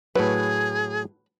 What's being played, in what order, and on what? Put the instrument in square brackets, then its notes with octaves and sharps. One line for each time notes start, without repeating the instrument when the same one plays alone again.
[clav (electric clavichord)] A2 F#3 [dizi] G#4 [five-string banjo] B4